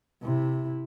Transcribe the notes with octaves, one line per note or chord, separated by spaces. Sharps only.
C3 E4